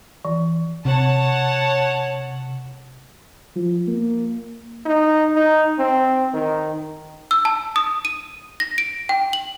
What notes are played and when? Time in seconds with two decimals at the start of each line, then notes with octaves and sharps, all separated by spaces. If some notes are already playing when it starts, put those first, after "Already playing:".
0.25 E3
0.85 C3 C#5 F#5 A5
3.56 F3
3.88 A#3
4.86 D#4
5.36 D#4
5.79 C4
6.34 D#3
7.31 E6
7.45 A5
7.76 D#6
8.05 D#7
8.60 A#6
8.78 D7
9.09 G5
9.33 F#7